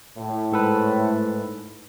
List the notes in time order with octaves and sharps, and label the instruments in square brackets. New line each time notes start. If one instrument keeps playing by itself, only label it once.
[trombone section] A2
[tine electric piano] G#2 A4 B4